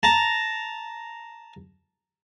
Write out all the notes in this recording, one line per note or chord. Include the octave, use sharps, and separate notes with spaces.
A5 A#5